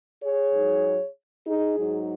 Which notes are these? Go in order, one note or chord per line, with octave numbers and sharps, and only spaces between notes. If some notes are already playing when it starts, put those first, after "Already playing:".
G#4 C#5
G#2 F#3 D#4
D#4 G#4
G#2 F#3 D#4